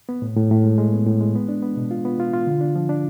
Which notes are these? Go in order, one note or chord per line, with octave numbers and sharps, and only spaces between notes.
B3
A2
A2
A2
G#3
G#3
B3
A2
G#3
B3
D4
B3
B2
F4
B3
F4
F4
D3
D4
F3
D4